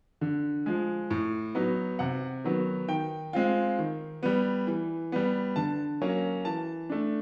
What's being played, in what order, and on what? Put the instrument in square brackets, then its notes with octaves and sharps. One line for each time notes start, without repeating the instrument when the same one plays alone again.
[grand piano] D3
F3 G#3
A2
F#3 B3 D#4
C3 F#5
D#3 F#3 B3
D#3 G5
G#3 C4 F4
D#3
G3 B3
E3
G3 B3
D3 A5
F#3 A#3 C#4
E3 A5
A3 D4